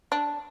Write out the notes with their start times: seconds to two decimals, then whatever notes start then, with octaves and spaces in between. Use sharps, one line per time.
0.12 D4